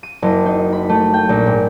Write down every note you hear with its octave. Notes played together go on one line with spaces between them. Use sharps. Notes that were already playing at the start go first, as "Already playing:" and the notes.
D#7
F#1
D#4
B5
A3
G5
A#1
G#2